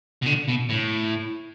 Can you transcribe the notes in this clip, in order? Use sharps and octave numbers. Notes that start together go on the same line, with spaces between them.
B2
D3
B2
A2